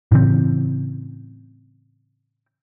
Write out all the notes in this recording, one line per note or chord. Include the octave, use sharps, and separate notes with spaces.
A2 C#3 E3 C4